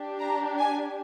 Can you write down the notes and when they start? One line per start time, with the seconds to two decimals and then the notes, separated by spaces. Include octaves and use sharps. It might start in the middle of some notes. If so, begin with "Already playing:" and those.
Already playing: D4 G4
0.19 A#5
0.58 G#5